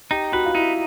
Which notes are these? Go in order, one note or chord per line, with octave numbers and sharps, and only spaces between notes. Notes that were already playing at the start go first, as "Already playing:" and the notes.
D#4 G4
F#4 B4
F4
D#4 E4